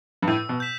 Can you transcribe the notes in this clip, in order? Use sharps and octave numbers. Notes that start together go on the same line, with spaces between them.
G2
A2 E6
B2
G6 B6 E7